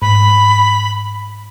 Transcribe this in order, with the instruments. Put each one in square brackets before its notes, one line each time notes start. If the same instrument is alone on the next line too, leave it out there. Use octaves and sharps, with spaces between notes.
[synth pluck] G#2 [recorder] B5